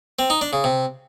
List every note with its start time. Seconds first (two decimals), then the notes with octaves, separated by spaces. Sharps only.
0.19 C4
0.30 D#4
0.41 D4
0.53 C#3
0.64 C3